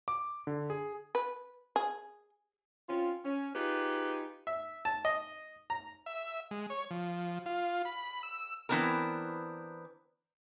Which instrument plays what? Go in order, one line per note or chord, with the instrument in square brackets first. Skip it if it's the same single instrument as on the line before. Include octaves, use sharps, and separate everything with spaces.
[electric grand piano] D6
D3
G#4
[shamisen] B4
G#4
[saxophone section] C4 C#4 F4
C#4
D#4 F4 G4 G#4 B4
[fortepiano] E5
A5
D#5
A#5
[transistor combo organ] E5
G#3
C#5
F3
F4
B5
E6
[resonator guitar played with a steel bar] E3 B3 C4 D4 A#4